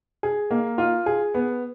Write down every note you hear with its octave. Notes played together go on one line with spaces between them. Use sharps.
G#4
A#3
F4
G#4
B3